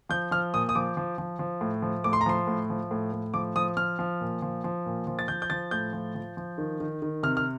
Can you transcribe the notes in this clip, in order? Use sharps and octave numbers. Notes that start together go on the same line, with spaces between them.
F3 G6
F3 F6
A#2 D#6
D#6
F3 D6
F3
F3
F3
A2
F3
A2 D6
C6
A#5
F3 C6
A2
F3
A2
A2
F3 D6
F3 D#6
F3 F6
F3
A#2
F3
F3
A#2
F3
A6
F3 G6
G6
F3 A6
A2 G6
F3
F3
F3
D#3
D#3
D#3
C3 F6
F6